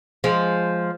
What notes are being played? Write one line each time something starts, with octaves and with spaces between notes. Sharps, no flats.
F3 G#3